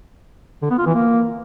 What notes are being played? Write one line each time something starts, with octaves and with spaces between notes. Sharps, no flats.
D3
B3
F4
E3
A#3